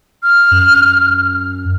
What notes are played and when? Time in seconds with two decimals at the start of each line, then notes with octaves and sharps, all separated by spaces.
0.23 F6
0.51 F#2